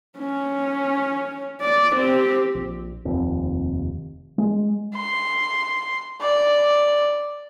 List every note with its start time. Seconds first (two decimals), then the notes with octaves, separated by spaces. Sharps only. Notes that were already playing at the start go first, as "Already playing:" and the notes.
0.18 C#4
1.61 D5
1.96 C4 G4
2.55 A#1
3.05 F1 D#2 C4
4.38 G#3
4.95 C6
6.21 D5